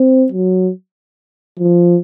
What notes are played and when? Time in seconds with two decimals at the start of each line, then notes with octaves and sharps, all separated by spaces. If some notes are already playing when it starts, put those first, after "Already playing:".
Already playing: C4
0.32 F#3
1.59 F3